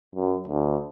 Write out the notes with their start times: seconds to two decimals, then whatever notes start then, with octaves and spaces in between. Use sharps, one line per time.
0.15 F#2
0.48 D2